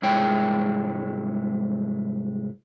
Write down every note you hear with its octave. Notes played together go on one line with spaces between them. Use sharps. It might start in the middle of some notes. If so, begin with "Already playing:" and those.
C2 G#2 G#3 E4 C#5 G5